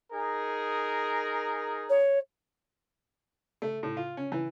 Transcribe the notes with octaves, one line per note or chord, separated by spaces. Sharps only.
D#4 G#4 A#4
C#5
A3
A2
F4
C#4
E3